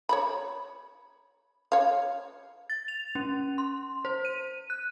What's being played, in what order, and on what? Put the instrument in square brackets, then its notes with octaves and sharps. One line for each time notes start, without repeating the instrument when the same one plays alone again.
[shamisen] C#5 A#5 B5
C#5 F5
[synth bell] A6
F7
C#4
C6
C5
D#7
F#6